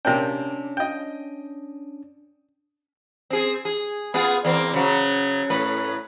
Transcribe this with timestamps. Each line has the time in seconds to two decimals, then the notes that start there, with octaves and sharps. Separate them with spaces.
0.05 C3 A#3 C#4 D4 G5
0.77 D#5 G5
3.30 C4 G#4
3.65 G#4
4.14 B3 F4 G#4
4.45 E2 A#3 C4
4.73 C#3 F#3
5.50 A2 A3 B4